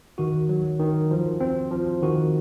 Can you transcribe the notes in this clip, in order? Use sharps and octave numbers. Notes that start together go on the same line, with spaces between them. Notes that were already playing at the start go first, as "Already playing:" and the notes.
D#3 F#4
F#3
D#3
F3
C4
F3
D#3 F#4